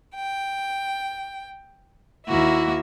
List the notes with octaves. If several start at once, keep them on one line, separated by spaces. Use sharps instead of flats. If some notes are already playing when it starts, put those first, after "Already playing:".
G5
D#2 A#3 E4 F#4 E5